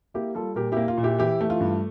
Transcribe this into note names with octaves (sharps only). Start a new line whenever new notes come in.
A#3 E4 G4
G3 F4 A4
A#2 G4 A#4
A#3 E4 G4
F4
A#2
E4 G4
E3 E4 G4
A3
F4
G2